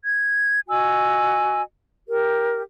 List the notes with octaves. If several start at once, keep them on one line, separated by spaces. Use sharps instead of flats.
G#6
F#4 D#5 G#5 E6
G4 A#4